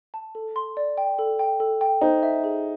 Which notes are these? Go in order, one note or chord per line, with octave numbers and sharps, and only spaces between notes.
A5
A4
C6
D5
G5
A4
G5
A4
G5
D#4 C5
E5
G#4